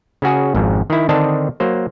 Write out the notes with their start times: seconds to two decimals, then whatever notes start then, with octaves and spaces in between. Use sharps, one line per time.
0.22 C#3 C#4 F#4 G#4
0.55 G#1 F2 G#2
0.90 D#3 E4
1.09 D3 D#3 C4 D4 D#5 A5
1.60 F#3 A#3 C5